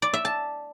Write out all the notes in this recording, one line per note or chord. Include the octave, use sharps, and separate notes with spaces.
D5
E5
A5